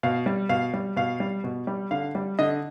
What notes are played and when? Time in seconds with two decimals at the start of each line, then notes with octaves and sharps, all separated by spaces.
0.03 B2 F5
0.26 G3
0.49 B2 F5
0.74 G3
0.96 B2 F5
1.20 G3
1.44 B2
1.67 G3
1.91 D3 F5
2.15 G3
2.39 D3 D#5